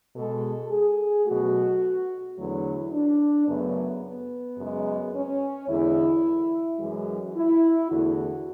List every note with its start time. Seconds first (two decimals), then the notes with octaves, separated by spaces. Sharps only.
0.15 B2 G#3 A4
0.71 G#4
1.26 B2 F#3 A3 F#4
2.36 E2 D3 F#3 A3 E4
2.91 D4
3.47 F#2 C#3 F#3 A3 B3
4.03 B3
4.58 F#2 C#3 G#3
5.13 C#4
5.68 E2 D3 G#3 E4
6.79 F#2 E3 G#3 F#4
7.35 E4
7.90 E2 D3 A3 F#4